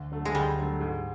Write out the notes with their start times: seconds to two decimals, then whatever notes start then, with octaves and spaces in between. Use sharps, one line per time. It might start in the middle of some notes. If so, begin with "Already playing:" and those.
Already playing: D2
0.12 D3 F#3 A3
0.25 G#3
0.34 D2 G3
0.57 D3 F#3 A3
0.80 G#2